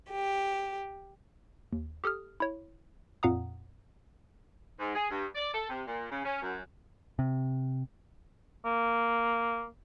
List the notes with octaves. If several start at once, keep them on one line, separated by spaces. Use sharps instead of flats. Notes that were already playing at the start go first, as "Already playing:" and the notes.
G4
D#2
G4 A4 D#6 F6
E4 C#5
F2 A#2 F5 F#5 A#5 D#6
G#2
G#4
G2
D5
A4
C3
A#2
C#3
C#4
F#2
C3
A#3